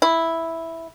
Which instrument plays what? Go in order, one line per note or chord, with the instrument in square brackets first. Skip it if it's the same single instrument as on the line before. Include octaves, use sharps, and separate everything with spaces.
[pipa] E4